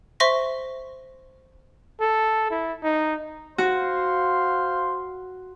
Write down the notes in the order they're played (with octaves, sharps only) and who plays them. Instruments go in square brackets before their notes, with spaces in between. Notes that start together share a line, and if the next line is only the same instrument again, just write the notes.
[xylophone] C5 E5 C6 C#6 A#6 B6
[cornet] A4
E4
D#4
[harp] F#4 [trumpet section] C5 F5 C6